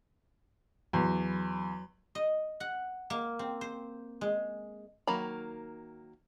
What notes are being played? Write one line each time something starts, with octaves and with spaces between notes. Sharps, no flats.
E2 F#3 B5 C6
D#5
F#5
A#3
C4
C5
G#3
D#3 F#3 A#3 A#5 B5